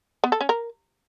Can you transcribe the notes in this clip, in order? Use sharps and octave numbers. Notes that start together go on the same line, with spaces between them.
B3
A4
C#4
A#4